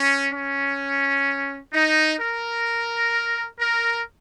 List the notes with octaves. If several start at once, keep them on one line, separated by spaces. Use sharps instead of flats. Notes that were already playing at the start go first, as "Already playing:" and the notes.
Already playing: C#4
C#4
D#4
A#4
A#4